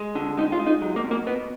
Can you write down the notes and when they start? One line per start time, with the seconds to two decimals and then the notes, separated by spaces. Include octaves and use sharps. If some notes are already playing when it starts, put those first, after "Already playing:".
Already playing: G#3
0.15 D3
0.38 G#3 D#4
0.52 F4
0.60 G#3
0.67 D#4
0.82 F#3
0.96 A#3
1.04 B2
1.11 A#3
1.26 B2 B3